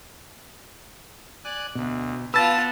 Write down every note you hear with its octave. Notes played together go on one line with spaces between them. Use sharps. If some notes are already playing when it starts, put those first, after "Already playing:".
D5 G#5 F#6
D2 B2
B3 F4 B4 A5 E6 A6